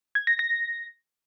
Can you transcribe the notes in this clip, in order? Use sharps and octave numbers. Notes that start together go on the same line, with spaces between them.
G#6
A#6
A#6